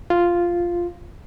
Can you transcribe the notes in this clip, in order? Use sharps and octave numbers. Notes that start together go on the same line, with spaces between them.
F4